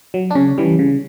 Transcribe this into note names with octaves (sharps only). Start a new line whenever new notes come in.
F#3
D4
C#3 C#4
E3 G3
C#3